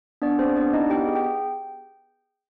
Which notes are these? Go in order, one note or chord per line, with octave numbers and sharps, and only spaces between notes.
B3 D4 D5
C4 G#4 C5
B3 D4 D5
D#4 E4 D#5
B3 G4 G5
G#4
G5